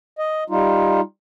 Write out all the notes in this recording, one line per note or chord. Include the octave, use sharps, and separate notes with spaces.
D#5
G3 D#4 F4